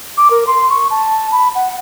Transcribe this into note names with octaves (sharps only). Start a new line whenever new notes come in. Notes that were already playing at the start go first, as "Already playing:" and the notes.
D6
A#4
C6
C#6
A5
B5
F#5